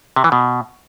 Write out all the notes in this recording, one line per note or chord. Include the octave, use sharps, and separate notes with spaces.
C3
E3
B2